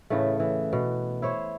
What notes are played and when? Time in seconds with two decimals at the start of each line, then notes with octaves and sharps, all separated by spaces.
0.10 A2 C#3 E3 A3
0.40 E3
0.73 B2
1.22 E4 C5 C#5